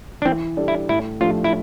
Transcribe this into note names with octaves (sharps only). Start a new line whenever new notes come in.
D4
E3 C4
G3 D4 A4 D5
E4
A2 E4
F3 A3 D4 F4 G4
E4